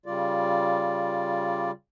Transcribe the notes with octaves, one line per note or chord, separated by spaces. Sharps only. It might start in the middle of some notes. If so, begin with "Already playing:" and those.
C#3 G3 F4 D5